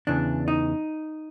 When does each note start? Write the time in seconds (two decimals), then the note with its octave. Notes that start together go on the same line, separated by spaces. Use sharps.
0.07 E2 C#3 E3 D4
0.48 D#4